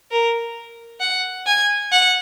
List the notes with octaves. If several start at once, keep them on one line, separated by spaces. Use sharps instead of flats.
A#4
F#5
G#5
F#5